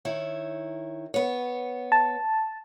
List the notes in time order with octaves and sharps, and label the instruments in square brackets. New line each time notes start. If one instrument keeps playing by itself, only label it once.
[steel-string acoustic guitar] D#3 E4 C#5
B3 C#5
[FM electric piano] A5